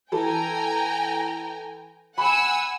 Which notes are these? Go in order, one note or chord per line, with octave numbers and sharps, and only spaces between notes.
E3 A4 G5 G#5 A#5
F#5 G#5 B5 E6